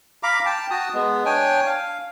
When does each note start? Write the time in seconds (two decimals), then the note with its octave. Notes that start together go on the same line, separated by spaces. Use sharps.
0.23 F5 A#5 B5 D6
0.45 G5 A5
0.70 F#4 A5 D#6
0.94 G#3 B3
1.26 D4 C#5 G5 G#5
1.66 F5